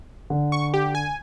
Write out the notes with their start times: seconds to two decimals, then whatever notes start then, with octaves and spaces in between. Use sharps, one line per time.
0.30 D3
0.52 C#6
0.74 G4
0.95 G#5